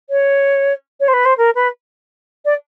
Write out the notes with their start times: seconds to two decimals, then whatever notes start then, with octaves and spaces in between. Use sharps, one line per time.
0.09 C#5
1.00 C#5
1.08 C5
1.13 B4
1.25 C5
1.37 A#4
1.55 B4
2.45 D5